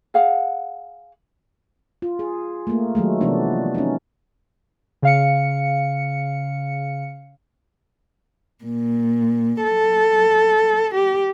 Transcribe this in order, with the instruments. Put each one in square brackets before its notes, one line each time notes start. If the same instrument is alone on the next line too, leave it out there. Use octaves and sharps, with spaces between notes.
[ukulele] G#4 F5 F#5
[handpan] F4
G#4
A3 A#3
D#3 F#3 G#3 A3
C3 E3 F3 G#3 B3 D4
C#4 D#4
[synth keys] C#3 F5 C#7
[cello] A#2
A4
G4